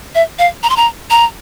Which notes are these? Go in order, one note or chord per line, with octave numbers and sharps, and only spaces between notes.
E5
F5
A#5
C6
A#5
A#5